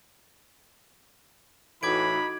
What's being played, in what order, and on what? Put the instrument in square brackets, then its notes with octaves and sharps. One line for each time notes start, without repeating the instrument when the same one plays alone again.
[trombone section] A2 E3 [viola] D#4 F#4 [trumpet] B5 [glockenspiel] D6 G#6 D7